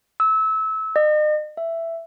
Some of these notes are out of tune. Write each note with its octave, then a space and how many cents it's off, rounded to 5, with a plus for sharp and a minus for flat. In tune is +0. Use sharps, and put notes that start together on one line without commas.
E6 -25
D#5 -40
E5 +10